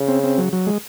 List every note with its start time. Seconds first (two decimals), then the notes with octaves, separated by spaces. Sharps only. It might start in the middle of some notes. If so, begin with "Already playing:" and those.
Already playing: C#3
0.08 C4
0.23 C4
0.38 F#3
0.53 F#3
0.67 G#3